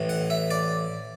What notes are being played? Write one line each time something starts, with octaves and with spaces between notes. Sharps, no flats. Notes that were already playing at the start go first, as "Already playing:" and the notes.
Already playing: A1 A2 E3
F#5
E5
D5